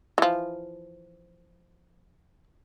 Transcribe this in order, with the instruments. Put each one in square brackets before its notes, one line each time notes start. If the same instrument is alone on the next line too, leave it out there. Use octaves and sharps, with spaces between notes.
[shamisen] E3 F3